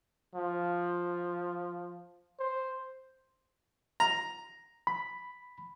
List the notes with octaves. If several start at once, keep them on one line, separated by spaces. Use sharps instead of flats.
F3
C5
A#5
B5